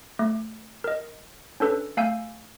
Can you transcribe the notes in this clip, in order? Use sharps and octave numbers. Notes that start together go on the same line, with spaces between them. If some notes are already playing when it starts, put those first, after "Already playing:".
A3
A#4 D#5
C#4 D4 A4 B4
A3 F5 G#5 E6 G6